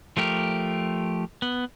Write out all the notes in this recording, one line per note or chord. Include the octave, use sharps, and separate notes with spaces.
F3 A3 G4 A#4
B3